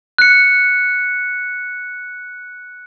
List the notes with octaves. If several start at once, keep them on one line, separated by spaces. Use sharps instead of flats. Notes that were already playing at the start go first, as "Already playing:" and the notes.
F#6 C#7